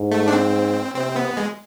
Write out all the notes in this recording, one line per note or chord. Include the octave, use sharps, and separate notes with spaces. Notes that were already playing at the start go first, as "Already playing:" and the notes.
Already playing: G#2
A3
D4
C4
C3 C4
B3
G#3